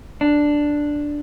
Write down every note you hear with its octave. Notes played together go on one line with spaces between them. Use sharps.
D4